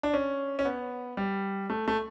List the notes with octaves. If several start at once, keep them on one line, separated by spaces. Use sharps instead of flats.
D4
C#4
C#4
B3
G3
A3
A3